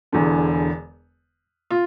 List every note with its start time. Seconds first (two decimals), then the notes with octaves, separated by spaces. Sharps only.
0.12 E1 E2 D3
1.70 F4